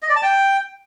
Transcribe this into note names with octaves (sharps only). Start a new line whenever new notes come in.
D#5
D5
A5
G5